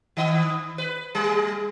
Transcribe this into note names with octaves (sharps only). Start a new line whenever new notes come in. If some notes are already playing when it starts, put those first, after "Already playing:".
D#3 D#5
B4
G3 G#4